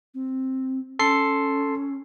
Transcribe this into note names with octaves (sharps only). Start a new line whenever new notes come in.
C4
C#4 A4 C6 C7